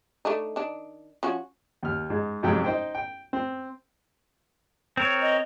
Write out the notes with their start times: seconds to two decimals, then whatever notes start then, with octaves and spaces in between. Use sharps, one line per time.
0.25 A3 D4 D#4
0.56 D#3 D4
1.23 F3 C#4 F#4
1.83 D#2 F6
2.10 G#2 D#4
2.43 F2 G#2 C3 F#3 G4 G5
2.64 D#4 C5 G5
2.95 G5
3.33 C4
4.97 C4 A#4 C#5
5.22 D#5